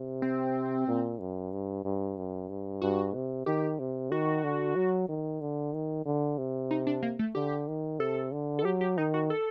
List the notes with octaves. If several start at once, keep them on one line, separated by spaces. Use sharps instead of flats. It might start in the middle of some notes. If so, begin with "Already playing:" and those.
Already playing: C3
C4
A#2
F#2
G2
G2
F#2
G2
G2 F#4
C3
D#3 G4
C3
D#3 F#4
D3
F#3
D#3
D3
D#3
D3
C3
D#4
D4
A#3
A3
D3 G4
D#3
C3 A4
D3
A4
F#3 G4
G4
D#3 D#4
F#4
A4